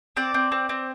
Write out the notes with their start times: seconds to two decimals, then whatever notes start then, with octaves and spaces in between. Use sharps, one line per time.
0.17 C4 D5
0.34 C4
0.52 C4
0.69 C4